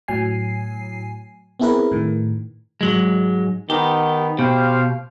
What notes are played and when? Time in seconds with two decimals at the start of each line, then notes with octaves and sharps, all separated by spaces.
0.08 A2 F#3 G#5 C7
1.60 B3 C4 E4 G#4 A#4 B4
1.92 A2 D#3
2.81 G#2 F#3 G#3
3.70 D#3 B3 G4
4.39 B2 G4 C5 F5